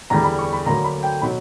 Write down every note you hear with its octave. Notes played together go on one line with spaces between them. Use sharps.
E2 D3 G3 A#5
B5
C#6
B5
D2 D3 F#3 A#3 A#5
B5
G5
B2 F#3 B5